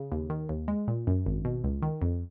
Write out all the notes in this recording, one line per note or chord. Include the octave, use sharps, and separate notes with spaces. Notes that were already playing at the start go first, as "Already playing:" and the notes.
Already playing: C#3
D#2
D#3
D#2
G#3
A#2
F#2
G#1
B2
C#2
D#3
F2